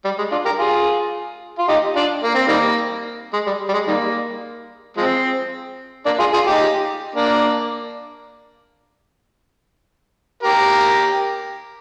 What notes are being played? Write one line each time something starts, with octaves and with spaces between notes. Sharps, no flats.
G3
G#3
D4 F4
G4 A#4
F4 G#4
F4
D#4 G4
D4 F4
A#3
C4
D#3 G3 A#3
G#3
G3
G3
G#3
D#3 G3 A#3
F3 G#3 C4
A#3 D4
F4 G#4
F4 G#4
D#4 G4
A#3 D4
G4 A#4